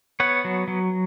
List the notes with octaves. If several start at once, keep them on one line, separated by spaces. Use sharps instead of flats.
B3 C#5 F#5
F#3
F#3